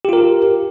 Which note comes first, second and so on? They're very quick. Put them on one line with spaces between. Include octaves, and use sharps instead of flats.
G4 F4 A#4